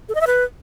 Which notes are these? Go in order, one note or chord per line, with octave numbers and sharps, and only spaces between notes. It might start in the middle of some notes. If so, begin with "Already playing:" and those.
A4
D#5
E5
B4